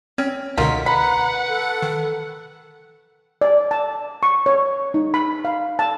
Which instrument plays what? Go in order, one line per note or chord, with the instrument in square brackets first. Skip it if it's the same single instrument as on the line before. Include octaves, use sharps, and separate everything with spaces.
[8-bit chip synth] C4 [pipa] C#4
[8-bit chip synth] C#2 B2 D3 [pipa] D#4 F4 A#4 [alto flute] F#5 [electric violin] B6
[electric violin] B4 F#5 [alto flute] A#5 [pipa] B5
[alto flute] A4
[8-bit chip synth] D#3
[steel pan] D5
A5
C#6
C#5
D#4
B5
F5
A5